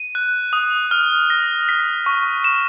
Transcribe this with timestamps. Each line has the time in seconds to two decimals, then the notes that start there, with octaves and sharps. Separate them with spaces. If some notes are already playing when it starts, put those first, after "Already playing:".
Already playing: D#7
0.15 F#6
0.53 D#6
0.91 F6
1.30 A#6
1.69 B6
2.06 C#6
2.44 E7